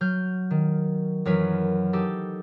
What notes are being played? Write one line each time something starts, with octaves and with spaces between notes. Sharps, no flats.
F#3 F6 G6
D#3
F#2 E3 F#3 A#4 B4
D#4 G4 A4